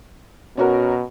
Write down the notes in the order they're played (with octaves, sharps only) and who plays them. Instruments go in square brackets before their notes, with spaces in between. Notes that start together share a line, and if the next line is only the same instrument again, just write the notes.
[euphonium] B2 [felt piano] C#4 F#4 A#4